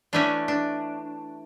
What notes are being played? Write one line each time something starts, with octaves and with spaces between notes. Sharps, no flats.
E3 A3 C#4 D4
D4